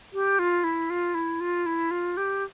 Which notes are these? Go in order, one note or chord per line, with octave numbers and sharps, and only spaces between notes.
G4
F4
E4
F4
E4
F4
E4
F4
G4